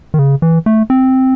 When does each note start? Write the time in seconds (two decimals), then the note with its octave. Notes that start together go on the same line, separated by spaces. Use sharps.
0.14 D#3
0.19 C#3
0.42 E3
0.66 A3
0.90 C4